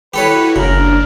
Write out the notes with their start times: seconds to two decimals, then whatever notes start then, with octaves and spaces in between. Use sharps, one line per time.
0.14 E4 F#4 G4 A4 B4 C#5
0.56 F#1 C#3 D4 A#4